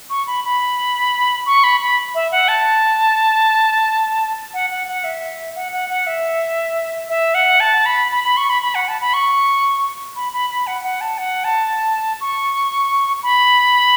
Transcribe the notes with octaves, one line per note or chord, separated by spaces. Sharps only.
C#6
B5
B5
C#6
B5
B5
E5
F#5
A5
F#5
F#5
F#5
E5
F#5
F#5
F#5
E5
E5
F#5
A5
B5
B5
B5
C#6
B5
B5
F#5
A5
B5
C#6
B5
B5
B5
F#5
F#5
A5
F#5
A5
C#6
B5